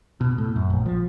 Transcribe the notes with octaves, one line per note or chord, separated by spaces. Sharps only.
B2
A2
F#2
A#1
F3